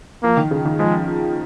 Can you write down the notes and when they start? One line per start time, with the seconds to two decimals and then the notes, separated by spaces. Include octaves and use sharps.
0.23 F3 A#3
0.37 D#3
0.51 C#3
0.65 D#3
0.79 F3 G#3